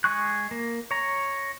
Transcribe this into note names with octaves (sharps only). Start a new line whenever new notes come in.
G#3 G#4 C#6 F#6
A#3
C#5 A#5